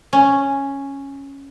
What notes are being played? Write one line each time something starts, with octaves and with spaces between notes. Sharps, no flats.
C#4